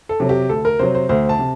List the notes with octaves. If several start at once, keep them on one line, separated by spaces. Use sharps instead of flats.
A4
C3 F#3
G4
D2 A4
A#4
C3 F#3 C5
C5
D2 C5
A5
C3